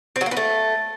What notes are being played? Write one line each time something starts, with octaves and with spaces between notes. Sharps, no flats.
C4
F#3
A#3
B3
A3